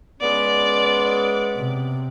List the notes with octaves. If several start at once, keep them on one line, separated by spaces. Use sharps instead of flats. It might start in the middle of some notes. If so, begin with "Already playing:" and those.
G#3 B3 C#4 D5
C3